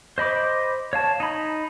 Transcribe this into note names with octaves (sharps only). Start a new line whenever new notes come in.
C5 D#5 B5 D6
C#5 F5 A5
D#4 B5